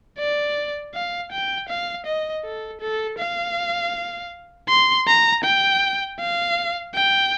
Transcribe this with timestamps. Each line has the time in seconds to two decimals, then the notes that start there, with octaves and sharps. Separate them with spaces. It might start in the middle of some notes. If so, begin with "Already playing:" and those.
0.18 D5
0.94 F5
1.32 G5
1.69 F5
2.06 D#5
2.44 A4
2.81 A4
3.19 F5
4.69 C6
5.07 A#5
5.44 G5
6.20 F5
6.94 G5